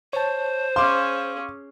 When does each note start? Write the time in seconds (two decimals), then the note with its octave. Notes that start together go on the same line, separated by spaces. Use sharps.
0.13 C5 C#5 A5
0.76 C#4 G#4 F5 C6 D6